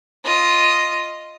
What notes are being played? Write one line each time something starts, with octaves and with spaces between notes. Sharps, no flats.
F4 D#5